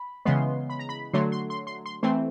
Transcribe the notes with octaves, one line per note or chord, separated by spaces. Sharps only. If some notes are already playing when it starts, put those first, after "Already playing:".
Already playing: B5
C#3 E3 G#3 B3 C6
B5
A#5
B5
D3 F#3 A3 C6
C6
C6
C6
C6
E3 A3 C4 C6